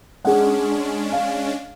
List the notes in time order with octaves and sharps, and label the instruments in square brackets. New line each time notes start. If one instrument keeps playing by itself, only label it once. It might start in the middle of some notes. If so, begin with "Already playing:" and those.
[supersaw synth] G#3 C#4 D4 [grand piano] G#4 F#5
[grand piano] F5